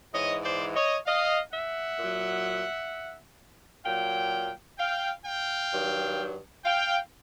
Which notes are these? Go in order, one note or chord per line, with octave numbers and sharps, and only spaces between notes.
G#2 E3 C#5 D#5
C5 D5
C#5 D#5
D#5 F5
E5 F#5
A#2 F#3
A#2 F#3 F5 G5
F5 G5
F5 G5
G2 D#3 F#3
F5 G5